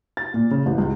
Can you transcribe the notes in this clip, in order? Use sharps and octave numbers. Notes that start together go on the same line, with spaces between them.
A6
A#2
C#3
A1
C#2